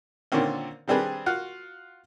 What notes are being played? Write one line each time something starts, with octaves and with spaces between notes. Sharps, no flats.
A#2 D3 D#3 C4 C#4
D#3 G3 C4 D4 G#4 B4
F4 F#4 F#5